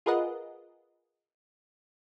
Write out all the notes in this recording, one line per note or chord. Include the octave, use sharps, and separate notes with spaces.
F4 G#4 A#4 B4 D#5 F#5